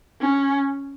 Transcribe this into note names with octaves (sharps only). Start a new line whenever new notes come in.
C#4